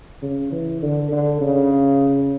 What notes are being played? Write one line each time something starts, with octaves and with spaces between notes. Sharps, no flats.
C#3
E3
D3
D3
C#3